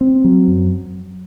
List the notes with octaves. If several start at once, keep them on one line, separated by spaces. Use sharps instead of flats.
C4
F#3
F#2